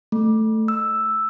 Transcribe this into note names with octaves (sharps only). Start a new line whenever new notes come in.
A3
E6